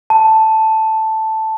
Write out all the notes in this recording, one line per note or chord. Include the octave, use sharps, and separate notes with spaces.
A5